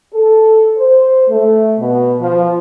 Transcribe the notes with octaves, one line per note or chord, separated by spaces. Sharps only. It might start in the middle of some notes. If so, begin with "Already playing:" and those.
A4
C5
A3
B2
F3